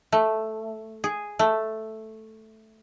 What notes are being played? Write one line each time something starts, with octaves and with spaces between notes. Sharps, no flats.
A3
G#4
A3